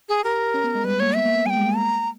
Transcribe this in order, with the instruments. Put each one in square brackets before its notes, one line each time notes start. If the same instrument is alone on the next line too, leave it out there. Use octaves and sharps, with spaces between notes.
[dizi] G#4
[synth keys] G4 [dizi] A#4
[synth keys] C#4
B3
G#3
[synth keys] G3 [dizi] B4
[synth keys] A#3 [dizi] C#5
[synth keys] B3 [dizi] E5
[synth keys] A#3
B3
[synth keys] G3 [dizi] G#5
[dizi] G5
[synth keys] G#3
A#3
[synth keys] A#3 [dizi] A#5